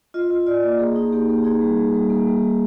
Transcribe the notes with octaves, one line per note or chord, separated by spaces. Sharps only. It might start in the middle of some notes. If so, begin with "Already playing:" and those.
F4 D#5
F4
F4 D5
A#3
A#3 G#4
D#4
A#3 G4
A#3
D#4 G#4
G3
G3
G3
A#3
G3
D#4